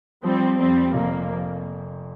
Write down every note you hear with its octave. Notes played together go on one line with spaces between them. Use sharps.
F3 G3 C4
F2 G3 C4
F1 F3 A#3